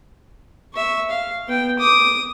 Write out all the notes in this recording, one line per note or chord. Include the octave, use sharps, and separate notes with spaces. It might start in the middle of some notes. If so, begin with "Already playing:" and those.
E5 C#6
F5
B3 G5
D6 D#6